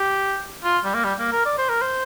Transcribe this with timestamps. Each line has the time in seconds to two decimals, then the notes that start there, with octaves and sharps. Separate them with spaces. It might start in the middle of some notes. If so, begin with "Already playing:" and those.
Already playing: G4
0.64 F4
0.84 G3
0.94 A#3
1.04 G3
1.19 A#3
1.32 A#4
1.46 D5
1.58 C5
1.69 A#4
1.82 C5